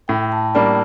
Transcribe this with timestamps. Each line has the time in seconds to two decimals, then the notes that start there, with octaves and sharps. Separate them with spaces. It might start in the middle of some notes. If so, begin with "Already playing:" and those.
0.08 A2 G5
0.32 A5
0.55 G3 A#3 D4 A5